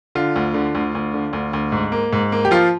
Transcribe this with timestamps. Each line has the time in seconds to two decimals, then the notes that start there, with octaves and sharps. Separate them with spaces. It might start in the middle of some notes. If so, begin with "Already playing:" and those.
0.15 D3 F4
0.36 D2
0.54 D3
0.75 D2
0.95 D2
1.14 D3
1.33 D2
1.53 D2
1.72 G#2
1.92 A#3
2.13 G#2
2.32 A#3
2.45 G4
2.51 F3 F4